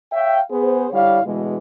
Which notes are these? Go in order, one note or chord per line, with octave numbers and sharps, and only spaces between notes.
C#5 E5 F5 G5
B3 G#4 C5
D3 G3 E4 C#5 F5
D2 B2 E3 G#3